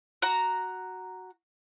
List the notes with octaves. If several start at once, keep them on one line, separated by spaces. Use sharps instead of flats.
F#4 A#5